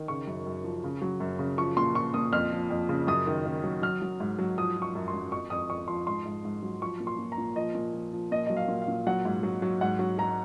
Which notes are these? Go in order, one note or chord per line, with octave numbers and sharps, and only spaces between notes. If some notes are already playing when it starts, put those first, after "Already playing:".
Already playing: D#3
C#3 C#6
F#2
F#2
F3
C#3
F#3
F#2
C#3
F3 C#6
A#2 C6
F3 C#6
A#2 D#6
F2 F6
F3
F2
C#3
F#2 D#6
D#3
D#3
F#3
F#3 F6
F#3
G#2
F#3
F3 D#6
F3
C#6
F#2
C6
F#2
F2 C#6
F2 D#6
F2 C#6
F3 C6
G#2 C6
G#2
G#2
F#3
F3 C#6
A#2
C6
A#2
A#5
A#2
F3 D#5
A#2
F3
F3
A#2 D#5
F#3 D#5
F5
A#2
F5
A#2
F#3 F#5
G#2
F#3
F#3
G#2 F#5
F#3
F#3 A#5